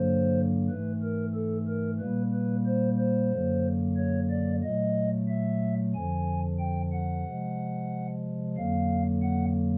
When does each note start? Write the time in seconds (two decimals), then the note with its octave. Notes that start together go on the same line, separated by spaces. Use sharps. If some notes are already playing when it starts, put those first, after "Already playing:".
Already playing: G2 D3 F#3 A#3 C5
0.70 G#2 E3 A3 B4
1.02 A#4
1.34 A4
1.68 A#4
2.00 A#2 G3 A#3 B4
2.33 B4
2.66 C5
2.98 C5
3.32 F#2 D3 F#3 A#3
3.97 C#5
4.30 D5
4.62 A#2 F#3 A3 D#5
5.28 E5
5.94 F2 D3 F3 G#5
6.59 G5
6.92 F#5
7.26 C3 F3 G#3
8.56 F2 D3 F#3 A#3 F5
9.23 F#5